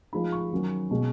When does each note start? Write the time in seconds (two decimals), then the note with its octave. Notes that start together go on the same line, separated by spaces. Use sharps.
0.13 F3 G#3 D#4 B5
0.32 C#6
0.52 D#3 F#3 C#4
0.91 B2 G#3 C#4